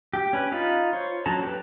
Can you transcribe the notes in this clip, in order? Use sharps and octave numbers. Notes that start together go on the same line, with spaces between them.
G4
C#4 B4
D#4 F4 B5
C5 C#5
F#3 C#4 A4 A5 A#5
G4 B4